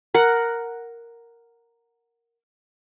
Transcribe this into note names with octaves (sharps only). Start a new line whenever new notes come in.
A#4 F#5